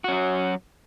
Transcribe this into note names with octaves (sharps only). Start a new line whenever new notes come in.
F#3 C#4 F#4